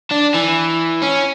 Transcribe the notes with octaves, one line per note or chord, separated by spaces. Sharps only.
D4
E3
C#4